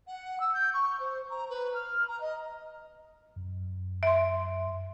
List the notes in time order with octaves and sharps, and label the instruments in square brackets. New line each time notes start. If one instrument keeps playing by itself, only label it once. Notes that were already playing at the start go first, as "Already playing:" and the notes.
[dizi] F#5
E6
G6
C#6
C5
A#5
B4
F6
A#5
D#5
[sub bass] F#2
[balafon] E5 C6